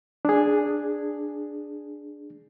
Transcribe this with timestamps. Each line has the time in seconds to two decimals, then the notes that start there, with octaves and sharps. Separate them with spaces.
0.25 D4 G#4